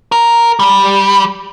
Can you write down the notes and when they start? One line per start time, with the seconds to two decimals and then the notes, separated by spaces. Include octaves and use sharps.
0.12 A#4
0.59 G3